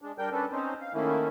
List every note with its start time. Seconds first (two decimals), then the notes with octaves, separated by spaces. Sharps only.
0.02 G#3 D4
0.18 G3 D4 A#4 G5 G6
0.32 C#4 D4 A4 B4
0.52 C4 C#4 D#4 C5
0.81 F5
0.94 D#3 A3 A#3 C#4 E4